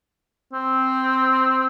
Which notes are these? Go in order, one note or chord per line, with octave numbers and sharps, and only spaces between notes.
C4